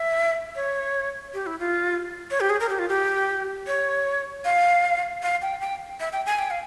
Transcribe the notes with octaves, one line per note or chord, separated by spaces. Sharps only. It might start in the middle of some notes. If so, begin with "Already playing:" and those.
Already playing: E5
C#5
G4
E4
F4
C#5
G4
G#4
A#4
G4
F4
G4
C#5
F5
F5
G5
G5
E5
G5
G#5
G5
F5